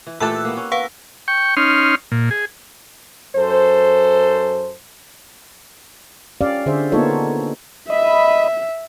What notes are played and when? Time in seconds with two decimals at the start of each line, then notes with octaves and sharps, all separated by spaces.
0.07 E3
0.20 A#2 E3 A3 G4 A4 A5 E6 F#6
0.45 A#3 B3
0.57 C#4
0.72 B4 F5 F#5 C#6
1.28 G5 C#6
1.57 C#4 D#4 C6 F6
2.12 A#2
2.31 G#4
3.36 F#2 A4 C5
6.41 C#4 G4 D5 F5
6.66 D3 G#4 C5 E5
6.92 A#3 B3 D#4 F4 A4 C#5
7.90 D#5 E5 B5